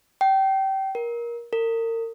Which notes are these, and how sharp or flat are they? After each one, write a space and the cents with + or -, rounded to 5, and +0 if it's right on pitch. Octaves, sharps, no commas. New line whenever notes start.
G5 -25
A#4 +20
A#4 -35